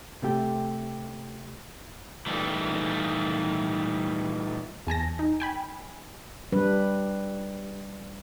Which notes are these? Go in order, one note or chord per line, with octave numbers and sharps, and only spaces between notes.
C3 A3 G4
A#2 D#3 E3 G3 A3
E2 G#5 A5 A#6
D#4
G5 G#5 B5
G3 D4 B4